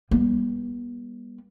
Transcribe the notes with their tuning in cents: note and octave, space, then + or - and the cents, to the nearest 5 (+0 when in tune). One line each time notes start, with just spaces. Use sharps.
G3 +15 B3 -40